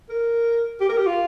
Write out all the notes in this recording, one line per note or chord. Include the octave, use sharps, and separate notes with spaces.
A#4
G4
A#4
G4
F4